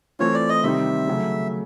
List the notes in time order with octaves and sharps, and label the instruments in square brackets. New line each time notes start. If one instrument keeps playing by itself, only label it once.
[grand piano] E3 A3 C4 F4 [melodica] C#5
[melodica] D5
D#5
[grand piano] C3 D#3 G3 C4 D#4 [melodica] E5
[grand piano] C#3 F#3 A3